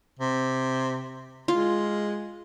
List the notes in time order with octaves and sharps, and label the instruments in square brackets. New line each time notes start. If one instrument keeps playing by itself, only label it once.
[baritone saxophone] C3
[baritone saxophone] G#3 [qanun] F4